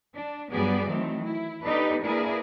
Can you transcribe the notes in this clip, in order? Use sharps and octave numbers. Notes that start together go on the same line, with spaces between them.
D4
G2 F#3 G3 B3 G#4 D5
D#3 E3 F#3 A3 C4
E4
B3 D4 D#4 G4 A4 B4
A#3 D4 E4 G#4 A#4 B4